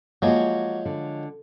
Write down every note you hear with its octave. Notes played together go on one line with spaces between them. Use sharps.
F3 F#3 G#3 A#3 F#4
D3